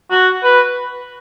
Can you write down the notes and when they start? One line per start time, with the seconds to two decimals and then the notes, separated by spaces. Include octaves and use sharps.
0.11 F#4
0.43 B4